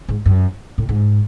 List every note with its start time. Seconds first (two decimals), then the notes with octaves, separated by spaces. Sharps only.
0.09 G#2
0.26 F#2
0.78 A2
0.89 G#2